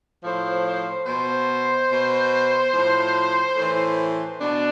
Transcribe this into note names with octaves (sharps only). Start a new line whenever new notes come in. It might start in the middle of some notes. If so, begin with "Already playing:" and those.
A2 F3 C5
C5
B2 C5
B2
A2 F3
A2 E3
B2 D4